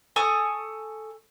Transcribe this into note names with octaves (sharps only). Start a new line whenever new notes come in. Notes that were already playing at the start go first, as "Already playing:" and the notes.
A4 G#5 C#6 D#6